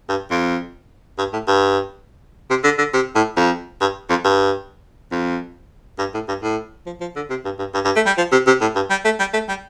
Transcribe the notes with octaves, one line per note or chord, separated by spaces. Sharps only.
G2
F2
G2
A2
G2
C3
D3
D3
C3
A2
F2
G2
F2
G2
F2
G2
A2
G2
A2
F3
F3
D3
C3
G2
G2
G2
G2
A3
G3
F3
C3
C3
A2
G2
G3
A3
G3
A3
G3